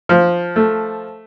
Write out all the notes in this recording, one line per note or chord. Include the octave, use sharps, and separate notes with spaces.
F3
A3